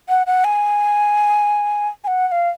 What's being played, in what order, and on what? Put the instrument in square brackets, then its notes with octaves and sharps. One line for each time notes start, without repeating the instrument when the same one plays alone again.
[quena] F#5
F#5
G#5
G#5
F#5
F#5
F5